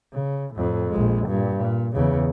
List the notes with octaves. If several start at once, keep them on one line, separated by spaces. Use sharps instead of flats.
C#3
F2 A2
A#1 G#3
G2 A#2
A#2
E2 C#3